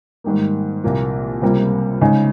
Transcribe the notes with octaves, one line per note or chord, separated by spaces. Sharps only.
G#2 D#3 G3 A#3
C2 A#2 F3 A#3 F4
C#2 C3 G3 A#3
C#3 G#3 D#4